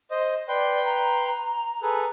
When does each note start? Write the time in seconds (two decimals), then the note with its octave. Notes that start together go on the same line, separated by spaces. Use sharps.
0.11 C5 D#5
0.48 B4 D5 G5 C6
0.85 A#5
1.82 G#4 A4 B4